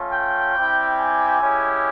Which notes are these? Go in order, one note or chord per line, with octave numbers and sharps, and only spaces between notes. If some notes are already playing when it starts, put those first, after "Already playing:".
Already playing: A3 C#4 F4
G5
G3 C4 E4 G4
G#5
G#3 C#4 E4 G4